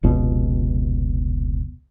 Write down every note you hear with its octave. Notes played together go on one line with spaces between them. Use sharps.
F1 C#2 B2